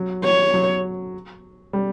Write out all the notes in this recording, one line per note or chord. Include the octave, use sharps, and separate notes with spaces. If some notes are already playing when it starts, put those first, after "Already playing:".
Already playing: F#3
C#5
F#3
G3